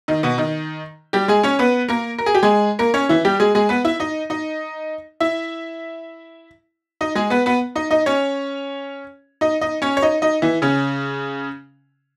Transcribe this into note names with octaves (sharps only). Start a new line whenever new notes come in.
D#3 D#4
B2 B3
D#3 D#4
G3 G4
G#3 G#4
C#4 C#5
B3 B4
A#3 A#4
A#4
G#4
G4
G#3 G#4
A#3 A#4
C#4 C#5
E3 E4
G3 G4
G#3 G#4
G#3 G#4
B3 B4
E4 E5
D#4 D#5
D#4 D#5
E4 E5
D#4 D#5
G#3 G#4
B3 B4
B3 B4
D#4 D#5
D#4 D#5
C#4 C#5
D#4 D#5
D#4 D#5
C#4 C#5
C#5
D#4 D#5
D#4 D#5
E3 E4
C#3 C#4